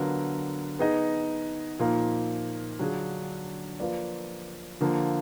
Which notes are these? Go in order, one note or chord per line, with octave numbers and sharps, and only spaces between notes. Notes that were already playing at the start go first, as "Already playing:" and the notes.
Already playing: D3 F#3 B3 F4 A#4
B3 D#4 G#4 D#5
A#2 F3 A#3 D#4
D3 F#3 D4 F4 G#4
F3 A#3 F4 B4 D5
D3 F3 A#3